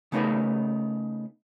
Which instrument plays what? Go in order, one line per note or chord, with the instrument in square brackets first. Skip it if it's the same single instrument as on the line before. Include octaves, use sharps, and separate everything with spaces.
[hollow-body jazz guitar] C#3 A3 B3 D#4 A#4 B4